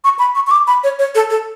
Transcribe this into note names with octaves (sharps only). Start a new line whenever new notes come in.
C#6
B5
C#6
C#6
D6
B5
C#5
C#5
A4
A4